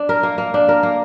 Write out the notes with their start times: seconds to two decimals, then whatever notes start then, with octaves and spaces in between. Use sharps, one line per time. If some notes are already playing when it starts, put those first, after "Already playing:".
Already playing: D4
0.09 A#4
0.23 A#3
0.38 A#3
0.54 D4
0.69 A#4
0.83 A#3